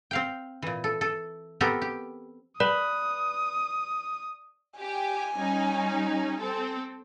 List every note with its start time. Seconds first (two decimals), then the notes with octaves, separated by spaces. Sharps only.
0.11 C4 F5 G5
0.62 A#2 E3
0.84 A4
1.01 A4
1.61 B3 C4 G4 A4 A#4
1.82 G4
2.60 B4 D5 D#6
4.80 G4 G#5
5.35 G3 C#4 D#4
6.39 C4 A4